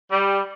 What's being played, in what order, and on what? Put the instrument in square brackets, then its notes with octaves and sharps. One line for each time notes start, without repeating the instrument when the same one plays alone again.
[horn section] G3